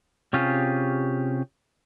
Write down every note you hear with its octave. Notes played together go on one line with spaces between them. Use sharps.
C3 C#4 F4 G4 G#4